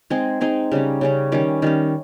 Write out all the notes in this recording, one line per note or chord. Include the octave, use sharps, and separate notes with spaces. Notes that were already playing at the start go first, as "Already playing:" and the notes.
G#3 C4 D#4 G#4
G#3 C4 D#4 G#4
C#3 G3 C#4
C#3 G3 C#4
D#3 G3 C#4
D#3 G3 C#4